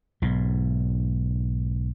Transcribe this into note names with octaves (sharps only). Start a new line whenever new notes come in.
B1 G#2